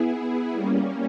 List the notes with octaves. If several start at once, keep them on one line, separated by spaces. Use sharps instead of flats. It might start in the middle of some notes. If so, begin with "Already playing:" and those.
Already playing: B3 E4 G#4
G3 A#3 C#4